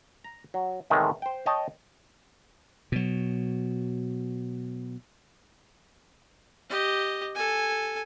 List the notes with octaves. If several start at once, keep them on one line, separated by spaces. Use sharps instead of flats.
A#5
F#3
E2 A2 C3 D#3 G#3 A3
C5 G5
C#5 D#5 G5 A5
B2 F#3
G4 D#5
A4 G#5